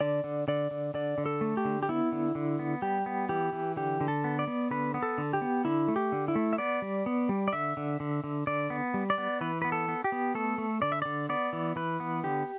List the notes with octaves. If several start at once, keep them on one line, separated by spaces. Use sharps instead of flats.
D3 D5
D3
D3 D5
D3
D3 D5
D3
A4
A3
G4
D3
G4
B3 E4
D3
D3
B3
G3 G4
B3
E3 G4
E3
D3 G4
D3
A4
B3
D5
B3
D3 B4
B3
A4
D3
G4
B3
D3 E4
A3
G4
D3
E4
A3
E5
B3 D5
G3
B3
G3
D5
D3 E5
D3
D3
D3
D3 D5
B3
G3
D5
B3
E3 B4
B3 B4
A4
B3
G4
B3
A3 A4
A3
D3 D5
E5
D3 D5
B3 D5
E3
E3 B4
B3
D3 G4